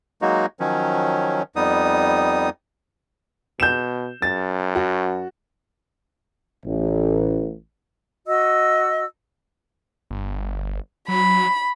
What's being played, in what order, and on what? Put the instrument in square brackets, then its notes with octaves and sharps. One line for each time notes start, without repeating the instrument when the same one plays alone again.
[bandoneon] F#3 G#3 A#3 D#4 F#4
D#3 F3 F#3 C#4
F2 G3 B3 D#4 D#6
[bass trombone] B2 [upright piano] G6 E7
[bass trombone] F#2 [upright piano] A6
[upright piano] F#4
[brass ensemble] A1
[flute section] F#4 D#5 E6
[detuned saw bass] G1
[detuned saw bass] F#3 [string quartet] B5